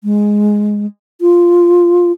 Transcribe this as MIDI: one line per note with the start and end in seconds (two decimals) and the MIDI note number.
0.04 0.86 56
1.21 2.12 65